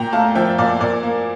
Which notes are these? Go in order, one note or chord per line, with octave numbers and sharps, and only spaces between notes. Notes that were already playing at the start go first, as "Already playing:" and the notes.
Already playing: A#2 G5 A#5
A3 F5 A5
F3 E5 G5
A#2 D5 F5
A#2 A#4 D5
A#3